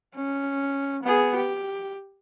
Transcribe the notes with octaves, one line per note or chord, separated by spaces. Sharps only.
C#4
B3 G#4
G4